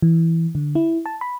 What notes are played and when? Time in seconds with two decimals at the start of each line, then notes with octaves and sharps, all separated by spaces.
0.02 E3
0.55 D3
0.75 E4
1.06 A5
1.21 B5